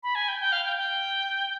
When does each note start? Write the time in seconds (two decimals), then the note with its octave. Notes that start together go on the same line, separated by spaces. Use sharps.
0.03 B5
0.15 G#5
0.28 G5
0.40 G5
0.52 F5
0.65 G5
0.77 G5